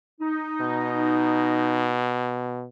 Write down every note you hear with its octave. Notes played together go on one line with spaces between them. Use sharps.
D#4
B2